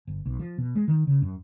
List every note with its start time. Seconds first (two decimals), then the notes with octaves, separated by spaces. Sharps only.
0.07 G1
0.26 B1
0.40 F3
0.58 B2
0.76 G#3
0.88 D#3
1.07 C#3
1.22 F#2